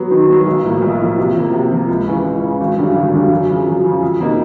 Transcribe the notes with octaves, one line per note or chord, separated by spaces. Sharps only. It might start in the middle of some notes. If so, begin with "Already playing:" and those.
Already playing: F#3 B3
D#3
F#3 B3
B1
A2 F3 A#3
B1
A2 F3 A#3
C3
F3 A#3
C3
F3 A#3
C#2
C#3 E3
C#2
C#3 E3
G#1
F#2 D3 G3
G#1
F#2 D3 G3
F#2
C#3 F3
F#2
C#3 F3
F2
C3 F3 A#3 D#4